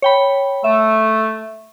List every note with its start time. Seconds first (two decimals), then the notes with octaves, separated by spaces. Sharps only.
0.02 C#5 G5 B5
0.64 A3 E5